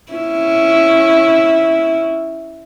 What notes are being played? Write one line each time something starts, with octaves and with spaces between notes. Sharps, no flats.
C#4 E4